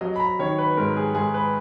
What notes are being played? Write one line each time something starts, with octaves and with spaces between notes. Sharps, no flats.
F#3 D#5
B5
A#5
D#3 C#5
B4
G#2 A#4
G#4
G#2 G#4
B4